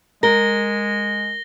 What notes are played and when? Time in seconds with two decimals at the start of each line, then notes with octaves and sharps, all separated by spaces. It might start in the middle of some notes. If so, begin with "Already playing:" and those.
0.23 G#3 A#4 A#6 G7